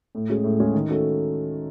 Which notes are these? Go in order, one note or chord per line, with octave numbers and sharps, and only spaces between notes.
A2
G#3 C#4 G#4
A2
G#3 C#4 G#4
D#3
A3 C#4 F#4 A4